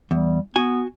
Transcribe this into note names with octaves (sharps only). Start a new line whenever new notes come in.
E2 G3
B3 F#4 G#5